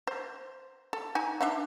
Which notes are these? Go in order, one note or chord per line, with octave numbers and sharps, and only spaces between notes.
C5
A4
D#4 G#5
D4 E5 F#5